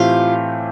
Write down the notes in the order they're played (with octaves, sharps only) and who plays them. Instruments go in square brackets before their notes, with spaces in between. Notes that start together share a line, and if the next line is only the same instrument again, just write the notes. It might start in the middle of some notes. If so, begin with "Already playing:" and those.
Already playing: [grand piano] A2 E3 A3 C4 G4 [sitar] F4